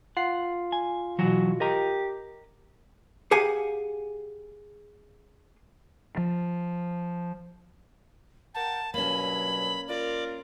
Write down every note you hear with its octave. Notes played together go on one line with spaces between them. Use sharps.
F4 F#5 C7
G#5
B2 E3 F#3 F#4
G4 A#4 D#5 A#5
G4 G#4 F5 F#5 G#5
F3
A#4 F#5 G5 A5
G2 B2 F#3 A#3 C#4 B5
F4 A#4 D5